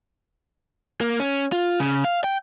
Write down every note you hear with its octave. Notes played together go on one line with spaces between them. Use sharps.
A#3
C#4
F4
C#3
F5
G5